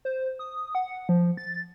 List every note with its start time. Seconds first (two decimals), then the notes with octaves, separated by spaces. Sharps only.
0.05 C5
0.39 D#6
0.75 F#5
1.09 F3
1.37 A6